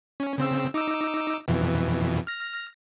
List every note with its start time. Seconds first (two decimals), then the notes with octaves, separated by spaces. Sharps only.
0.20 C#4
0.38 C#3 C4 E6
0.74 D#4 D6 E6
1.48 F2 B2 E3
2.27 F6 A#6